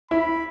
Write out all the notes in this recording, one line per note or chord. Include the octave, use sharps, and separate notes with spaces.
E4 B5